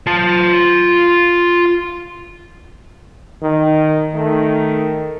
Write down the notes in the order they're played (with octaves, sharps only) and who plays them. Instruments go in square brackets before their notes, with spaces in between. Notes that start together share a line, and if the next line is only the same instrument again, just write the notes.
[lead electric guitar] F4 A5
[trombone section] D#3
D#3 A3